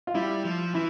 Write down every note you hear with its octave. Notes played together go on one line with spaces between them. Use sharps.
F4
G3 E4
F3
E3 E4